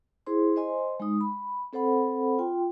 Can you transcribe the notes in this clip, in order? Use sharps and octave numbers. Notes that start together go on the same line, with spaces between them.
E4 G#4 C5 C6
C5 D#5 G#5 C6
G#3 D#4 D#6
B5
C4 A4 C5 F#5 B5
F4 G5 C6